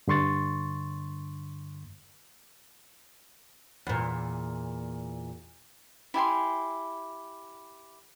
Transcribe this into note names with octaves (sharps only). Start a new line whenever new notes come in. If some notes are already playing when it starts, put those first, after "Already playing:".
G2 D3 C6 C#6 A6
E2 A#2
E4 G4 G#5 C6